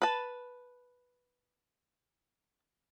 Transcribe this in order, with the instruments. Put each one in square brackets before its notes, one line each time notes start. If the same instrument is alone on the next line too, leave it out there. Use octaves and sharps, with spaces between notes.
[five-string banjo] B4 A5